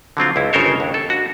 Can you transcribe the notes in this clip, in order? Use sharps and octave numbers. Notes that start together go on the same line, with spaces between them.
D3 F#3 C4 F4
C#2 E4
G1 C#3 A4 A#4 C5 C#5
D#2 D4
A4
D4 F#4